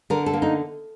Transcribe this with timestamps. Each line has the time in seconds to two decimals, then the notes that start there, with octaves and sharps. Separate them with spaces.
0.10 D3 A#4
0.26 A4
0.33 A#3
0.42 D#4